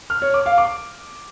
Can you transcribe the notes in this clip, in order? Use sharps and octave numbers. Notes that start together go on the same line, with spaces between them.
F6
C#5
D6
F5
D6